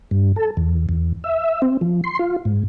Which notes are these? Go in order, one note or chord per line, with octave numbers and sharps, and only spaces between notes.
G2
A4
E2
E2
E5
C4
F3
C6
F4
G#2